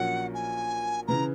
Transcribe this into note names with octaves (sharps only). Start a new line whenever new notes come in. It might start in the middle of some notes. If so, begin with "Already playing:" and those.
Already playing: A#1 A#2 F#3 C#4 F#5
G#5
C#3 E3 A#5